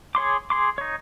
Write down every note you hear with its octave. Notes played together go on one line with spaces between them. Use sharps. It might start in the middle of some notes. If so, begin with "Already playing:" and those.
G#4 C#5 C6 D6
G#4 C6 D6
D#4 C#5